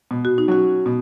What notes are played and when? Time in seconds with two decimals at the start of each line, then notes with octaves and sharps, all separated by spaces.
0.11 B2
0.25 F#4
0.38 D#4
0.48 F#3 C#4 F#4
0.86 B2